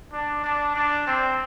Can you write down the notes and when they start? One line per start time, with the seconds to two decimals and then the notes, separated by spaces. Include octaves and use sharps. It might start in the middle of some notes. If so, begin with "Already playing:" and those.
0.12 D4
0.44 D4
0.75 D4
1.07 C4